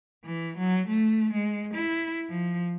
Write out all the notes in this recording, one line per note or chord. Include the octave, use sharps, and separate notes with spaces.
E3
F#3
A3
G#3
E4
F3